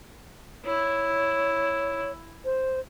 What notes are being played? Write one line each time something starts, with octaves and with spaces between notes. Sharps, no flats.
E4 C#5
C5